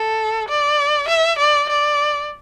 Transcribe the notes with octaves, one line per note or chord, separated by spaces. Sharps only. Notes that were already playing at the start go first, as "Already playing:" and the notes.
Already playing: A4
D5
E5
D5
D5